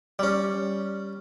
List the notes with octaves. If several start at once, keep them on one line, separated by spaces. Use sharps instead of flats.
G3 C#4